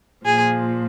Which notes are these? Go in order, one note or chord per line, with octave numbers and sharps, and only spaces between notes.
A#2 F3 G#4